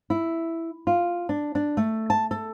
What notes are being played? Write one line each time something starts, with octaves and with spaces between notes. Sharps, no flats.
E4
F4
D4
D4
A3
A5
A4